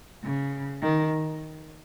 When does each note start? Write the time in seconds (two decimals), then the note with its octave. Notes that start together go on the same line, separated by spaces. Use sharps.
0.23 C#3
0.82 D#3